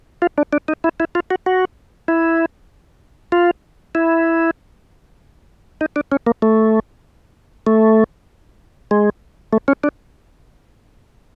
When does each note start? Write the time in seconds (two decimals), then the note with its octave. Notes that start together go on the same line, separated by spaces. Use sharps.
0.22 F4
0.38 D4
0.53 D4
0.68 D#4
0.84 E4
1.00 E4
1.15 F4
1.30 F#4
1.46 F#4
2.08 E4
3.32 F4
3.95 E4
5.81 D#4
5.96 D4
6.12 C#4
6.27 A#3
6.42 A3
7.67 A3
8.91 G#3
9.53 A3
9.68 C#4
9.84 D4